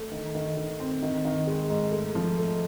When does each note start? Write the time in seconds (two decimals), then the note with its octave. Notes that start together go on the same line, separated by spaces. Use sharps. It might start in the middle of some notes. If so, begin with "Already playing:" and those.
Already playing: A3
0.12 D#3
0.35 D#3
0.57 D#3
0.80 C4
1.03 D#3
1.25 D#3
1.47 G#3
1.70 G#2
1.92 A3
2.15 F3
2.38 A3